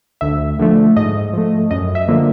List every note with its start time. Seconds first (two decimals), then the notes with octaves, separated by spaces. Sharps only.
0.21 D2 E5
0.59 D3 F3 A3
0.97 G#2 D#5
1.33 F3 A3
1.71 F#2 D#5
1.95 E5
2.08 D3 F3 A#3